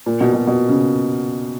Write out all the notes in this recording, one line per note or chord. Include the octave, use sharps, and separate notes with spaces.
A#2
B2
B2
B2
C#3